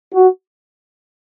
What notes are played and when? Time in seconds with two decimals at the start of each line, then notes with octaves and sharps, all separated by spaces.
0.13 F#4